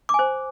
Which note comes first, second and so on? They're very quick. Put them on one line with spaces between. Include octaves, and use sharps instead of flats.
D6 G#5 C5